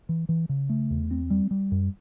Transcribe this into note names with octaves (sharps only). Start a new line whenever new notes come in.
E3
E3
C#3
A3
E2
C4
G3
G3
F#2